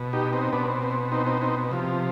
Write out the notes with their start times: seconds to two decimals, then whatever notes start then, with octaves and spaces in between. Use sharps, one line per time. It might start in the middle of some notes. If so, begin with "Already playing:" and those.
Already playing: B2
0.13 D#4 G4
0.33 C4 D#4
0.52 B2 B3 D4
0.67 C4
0.82 C4
1.12 C4 D#4
1.26 C4 D#4
1.42 C4 D#4
1.71 C3 F3